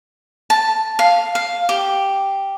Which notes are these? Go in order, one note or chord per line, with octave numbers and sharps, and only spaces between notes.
A5
F5
F5
G4